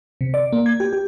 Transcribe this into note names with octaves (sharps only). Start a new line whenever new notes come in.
C3
D5
A#3
G#6
G4
G4